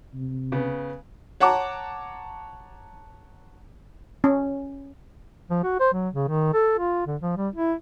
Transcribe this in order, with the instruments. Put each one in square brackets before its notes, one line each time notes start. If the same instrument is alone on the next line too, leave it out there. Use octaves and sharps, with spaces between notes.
[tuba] C3
[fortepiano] C#3 B3
[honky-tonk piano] C#5 F#5 A5 A#5 D6
[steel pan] C#4
[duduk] F3
F#4
C5
F#3
C#3
D#3
A4
F4
D3
F3
G3
E4